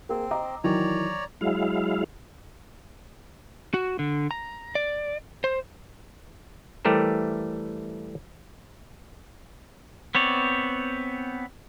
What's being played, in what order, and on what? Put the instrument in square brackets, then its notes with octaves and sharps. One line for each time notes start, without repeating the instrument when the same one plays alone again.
[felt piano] A#3 G#4 [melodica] C4
[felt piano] D#5 A#5 D6
[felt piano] D#3 E3 F#3 [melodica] C#5 D5 A#5
[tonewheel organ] F#3 G#3 E4 F5
[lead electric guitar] F#4
D3
A#5
D5
C5
[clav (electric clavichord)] E3 G3 A3 G4 A#4 C5
[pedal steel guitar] B3 C4 C#5 D5